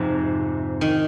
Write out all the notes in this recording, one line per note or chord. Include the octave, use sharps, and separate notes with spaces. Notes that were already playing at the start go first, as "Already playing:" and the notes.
Already playing: F2 G#2 C3
D#3